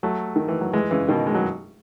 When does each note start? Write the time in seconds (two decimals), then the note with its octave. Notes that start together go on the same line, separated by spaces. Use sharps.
0.03 F#3 A3
0.36 D#3
0.48 E3
0.61 F#3
0.73 E3 G#3
0.91 C#3 E3
1.08 B2 D#3
1.27 G#3
1.34 F#3